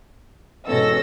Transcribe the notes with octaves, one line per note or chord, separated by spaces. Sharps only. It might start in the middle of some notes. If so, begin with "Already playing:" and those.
E2 G#2 B2 C#4 A4 E6 A#6